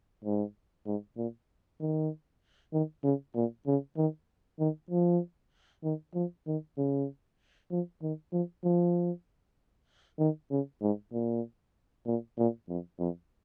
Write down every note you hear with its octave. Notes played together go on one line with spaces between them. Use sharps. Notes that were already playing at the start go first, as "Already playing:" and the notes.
G#2
G#2
A#2
D#3
D#3
C#3
A#2
C#3
D#3
D#3
F3
D#3
F3
D#3
C#3
F3
D#3
F3
F3
D#3
C#3
G#2
A#2
A#2
A#2
F2
F2